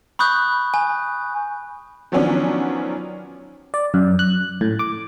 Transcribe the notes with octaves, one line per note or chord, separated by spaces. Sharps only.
B5 C#6 D#6 F#6 G6
G#5
D#3 F3 F#3 B3 C#4 D4
D5
F#2
F#6
A2
D6